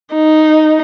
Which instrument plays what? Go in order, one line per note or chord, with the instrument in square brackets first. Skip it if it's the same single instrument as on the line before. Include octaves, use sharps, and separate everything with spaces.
[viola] D#4